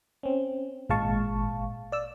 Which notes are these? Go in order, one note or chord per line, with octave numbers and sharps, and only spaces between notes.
C4 C#4
G#1 A#2 G#3 F5 A5 C#6
D5 E6